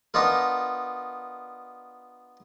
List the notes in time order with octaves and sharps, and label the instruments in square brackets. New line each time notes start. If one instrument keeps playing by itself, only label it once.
[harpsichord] B3 D4 D#4 F4 A#4